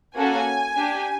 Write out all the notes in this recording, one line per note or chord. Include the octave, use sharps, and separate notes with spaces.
A#3 C#4 F#4 A4 G#5
D4 G4